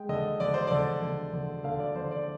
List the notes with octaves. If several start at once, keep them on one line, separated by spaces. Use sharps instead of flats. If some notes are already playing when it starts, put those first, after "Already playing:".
Already playing: G#3 G5
D3 D#5
D3 D5
C5
D3 D5
D3
D3
D3 F5
D5
D3 C5
D5